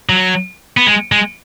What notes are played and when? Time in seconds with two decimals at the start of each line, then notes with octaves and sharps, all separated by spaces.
0.09 F#3
0.77 B3
0.87 G#3
1.12 G#3